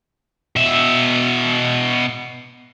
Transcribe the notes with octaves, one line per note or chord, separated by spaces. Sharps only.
B2 E5